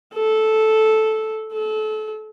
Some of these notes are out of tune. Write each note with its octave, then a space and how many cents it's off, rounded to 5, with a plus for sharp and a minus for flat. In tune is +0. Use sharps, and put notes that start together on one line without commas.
A4 -10
A4 -30